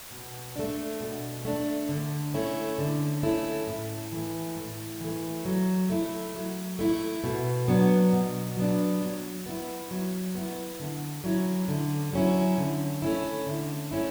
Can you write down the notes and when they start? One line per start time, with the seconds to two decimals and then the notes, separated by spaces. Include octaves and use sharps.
0.11 B2
0.56 A3 D4
1.00 B2
1.45 A3 D4
1.89 D3
2.34 A3 C#4 E4
2.79 D3
3.23 A3 C#4 E4
3.67 A2
4.12 E3 A3
4.56 A2
5.01 E3 A3
5.45 F#3
5.90 A3 E4
6.35 F#3
6.79 A3 E4
7.24 B2
7.68 F#3 B3 D4
8.13 B2
8.57 F#3 B3 D4
9.02 F#3
9.46 B3 E4
9.91 F#3
10.35 B3 E4
10.80 D3
11.24 F#3 C#4 E4
11.68 D3
12.13 F#3 C#4 E4
12.58 D3
13.02 A3 C#4 E4
13.46 D3
13.91 A3 C#4 E4